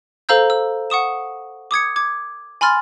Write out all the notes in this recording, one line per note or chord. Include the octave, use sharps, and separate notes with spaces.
A4 C5 F5 A#5 E6 G6
E6
F#5 C#6 D#6 E7
D6 D#6 G#6 C#7
D6 G#6
G#5 B5 C6 F6 A6